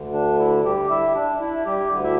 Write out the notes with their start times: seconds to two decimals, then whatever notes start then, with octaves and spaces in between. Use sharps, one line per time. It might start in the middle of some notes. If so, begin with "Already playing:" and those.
Already playing: D2 D3
0.14 D4
0.39 E4
0.64 G3 G4
0.90 E4 E5
1.15 D4
1.40 E4
1.66 G3 G4
1.91 D2 D3
2.04 E4 E5